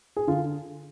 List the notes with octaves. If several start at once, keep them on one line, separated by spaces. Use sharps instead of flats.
G#4
D3 F4